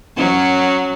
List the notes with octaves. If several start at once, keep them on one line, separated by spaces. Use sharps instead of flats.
F#3 C#4